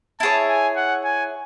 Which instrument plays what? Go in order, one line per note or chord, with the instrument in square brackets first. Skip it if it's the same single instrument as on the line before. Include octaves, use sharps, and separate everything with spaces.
[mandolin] E4 G#4 C#5 [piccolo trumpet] A5
[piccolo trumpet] G#5
F#5
G#5